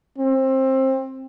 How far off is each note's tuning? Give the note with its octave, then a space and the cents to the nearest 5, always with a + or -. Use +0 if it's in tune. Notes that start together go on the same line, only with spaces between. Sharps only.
C4 +20